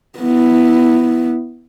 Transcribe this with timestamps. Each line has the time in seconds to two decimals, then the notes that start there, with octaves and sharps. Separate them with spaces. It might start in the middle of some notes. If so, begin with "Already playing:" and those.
0.19 B3 E4